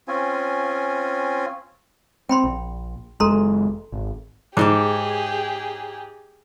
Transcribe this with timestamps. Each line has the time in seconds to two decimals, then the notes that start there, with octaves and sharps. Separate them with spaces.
0.08 C4 C#4 F4 G#5
2.29 C4 G5 B5 C6
2.44 A#1
3.20 F#1 G#3 A4 A#5 C6
3.92 G#1
4.57 G#2 G4 G#4 A5 C6 D6